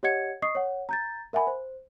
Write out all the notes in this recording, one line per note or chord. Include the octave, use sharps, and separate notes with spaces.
G4 C#5 D#5 F#5 G#6 C#7
D#5 C#6 D#6 C7
C#5 F#5
A#5 G6 A6
A#4 E5 F#5 G#5 B5
C5